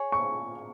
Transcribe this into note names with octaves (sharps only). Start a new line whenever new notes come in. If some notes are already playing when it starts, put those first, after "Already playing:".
Already playing: G#4 C#5
C#6